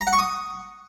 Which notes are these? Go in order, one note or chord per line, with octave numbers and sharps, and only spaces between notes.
A#5
F#5
C#6
D#6